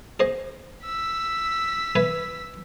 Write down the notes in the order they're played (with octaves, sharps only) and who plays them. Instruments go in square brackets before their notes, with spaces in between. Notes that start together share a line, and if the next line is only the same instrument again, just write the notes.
[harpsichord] G#4 C5 D#5
[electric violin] E6 B6
[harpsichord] B4 E5 G#5